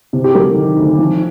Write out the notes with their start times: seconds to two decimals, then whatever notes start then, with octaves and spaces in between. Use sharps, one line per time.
0.13 C3
0.24 G4
0.35 F#3 A#4
0.56 D#3
0.77 D2
0.98 F3